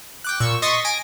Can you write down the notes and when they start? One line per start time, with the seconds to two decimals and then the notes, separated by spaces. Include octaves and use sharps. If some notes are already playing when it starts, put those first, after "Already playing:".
0.24 G5 D6 F#6
0.40 A#2 C#6 E6
0.62 D#5 C6 C#6 D#6 A6 B6
0.85 G#5 A#6 D7